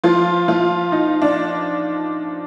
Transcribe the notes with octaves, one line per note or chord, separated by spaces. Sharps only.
F3 F4
F3 F4
D#4
D4